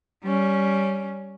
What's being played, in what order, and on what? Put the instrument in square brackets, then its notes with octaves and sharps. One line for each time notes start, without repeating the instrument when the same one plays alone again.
[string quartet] G3 C#4